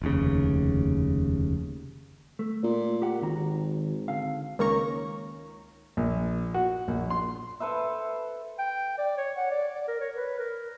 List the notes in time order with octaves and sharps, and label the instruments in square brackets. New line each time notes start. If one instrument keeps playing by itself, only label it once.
[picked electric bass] F1 D#2 C#3
[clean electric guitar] A3
[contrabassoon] A#2
[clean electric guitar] G4 F#5
[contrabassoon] G#1 [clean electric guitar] D#3 F#4 A#5
[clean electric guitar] D3 F5
[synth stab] C#2 D#3 A#3 C#4 A#5 C#6
[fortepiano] A#1
F#4
A#1
C6
[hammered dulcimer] A4 B4 C5 E5
[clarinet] G5
D5
C#5
F#5
D5
D5
A#4
C#5
B4
A#4